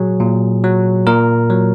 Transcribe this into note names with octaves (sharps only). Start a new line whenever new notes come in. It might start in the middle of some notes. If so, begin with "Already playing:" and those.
Already playing: A#2 F#3 G#4
A#2
F#3
A#2 A#4
F#3